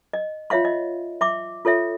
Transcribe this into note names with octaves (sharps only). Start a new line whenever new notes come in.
D#5
F4 C#5 E5 F5 C6
D#5
E5 C6 D6
F4 A4 C#5 E5